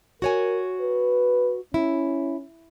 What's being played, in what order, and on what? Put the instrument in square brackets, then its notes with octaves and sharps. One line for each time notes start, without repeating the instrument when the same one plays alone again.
[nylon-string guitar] F#4 C#5 G#5 [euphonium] A#4
[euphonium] B4
[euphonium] C#4 [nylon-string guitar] E4